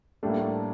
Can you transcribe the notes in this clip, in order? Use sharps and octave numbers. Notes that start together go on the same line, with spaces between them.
A2 G3 A3 D4
A#3
A3